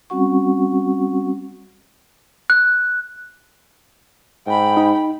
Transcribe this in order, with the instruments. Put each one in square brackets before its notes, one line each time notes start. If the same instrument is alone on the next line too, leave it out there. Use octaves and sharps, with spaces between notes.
[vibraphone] G3 C4 C#4 F#4 F#5 C#6
[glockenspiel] F#6
[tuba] G#2 [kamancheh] G5 B5
[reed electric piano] D#4